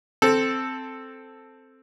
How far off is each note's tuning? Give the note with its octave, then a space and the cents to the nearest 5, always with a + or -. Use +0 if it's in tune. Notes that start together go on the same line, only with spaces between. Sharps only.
C4 +0 A4 +0